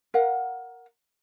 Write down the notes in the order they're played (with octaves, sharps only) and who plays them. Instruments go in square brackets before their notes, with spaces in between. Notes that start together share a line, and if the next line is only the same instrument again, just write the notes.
[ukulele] A#4 F5 F#5